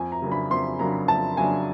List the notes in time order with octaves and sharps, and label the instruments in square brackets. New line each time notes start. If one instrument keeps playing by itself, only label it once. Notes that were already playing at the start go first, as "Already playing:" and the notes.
Already playing: [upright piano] F2 G#5
A#5
C#3 F#3 A#3 D4
B5
F2 C6
C#3 F#3 A#3 D4 A#5
F2 A5
C#3 F#3 A#3 D4 G#5